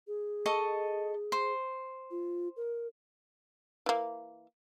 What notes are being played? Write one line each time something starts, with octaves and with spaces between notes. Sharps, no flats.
G#4
A4 D#5 C#6
C5
F4
A#4
E3 A#3